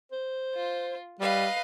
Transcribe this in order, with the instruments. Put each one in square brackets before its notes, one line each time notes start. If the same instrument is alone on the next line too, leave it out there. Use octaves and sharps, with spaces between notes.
[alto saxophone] C5
[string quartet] F4
[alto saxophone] G3 [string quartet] B4 D#5 F5